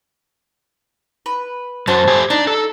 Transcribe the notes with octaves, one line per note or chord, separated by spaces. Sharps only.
B4
F#2 F#3 C5 A5
A3 G4 G#5
D4 D#4
A4